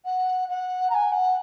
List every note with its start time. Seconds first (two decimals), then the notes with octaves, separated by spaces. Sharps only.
0.05 F#5
0.48 F#5
0.89 A#5
0.94 G#5
1.11 F#5